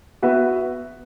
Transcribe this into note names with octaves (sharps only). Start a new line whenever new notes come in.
B3 F#4 B4 E5